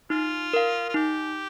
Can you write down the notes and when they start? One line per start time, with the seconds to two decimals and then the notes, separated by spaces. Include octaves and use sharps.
0.10 D#4 F4
0.53 A#4 F5
0.89 F4
0.94 D#4 G4